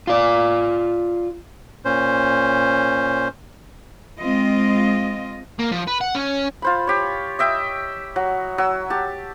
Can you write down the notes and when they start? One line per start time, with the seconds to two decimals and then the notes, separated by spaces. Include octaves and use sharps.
0.07 F4 D5
1.85 A#2 C#4 C5
4.19 G#3 C4 F4 D#5
5.59 A#3
5.72 F3
5.88 B4
6.01 F#5
6.15 C#4
6.62 F4 C5 B5
6.87 G4 C#5
7.39 D#5 E5 G5
8.16 F#3
8.58 F#3 E6
8.90 G4 A5